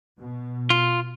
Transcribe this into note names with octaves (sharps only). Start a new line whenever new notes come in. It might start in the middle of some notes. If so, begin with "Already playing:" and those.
B2
F4